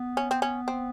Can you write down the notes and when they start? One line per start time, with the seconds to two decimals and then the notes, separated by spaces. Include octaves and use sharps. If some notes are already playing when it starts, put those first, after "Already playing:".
Already playing: B3
0.17 C#4
0.31 C4
0.42 C#4
0.68 C4